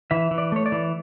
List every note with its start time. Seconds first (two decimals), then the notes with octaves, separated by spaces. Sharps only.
0.11 E3 E5
0.31 E3
0.38 D5
0.52 A3 C#5
0.66 D5
0.72 E3